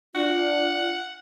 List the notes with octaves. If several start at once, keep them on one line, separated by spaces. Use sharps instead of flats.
D4 F4 F#5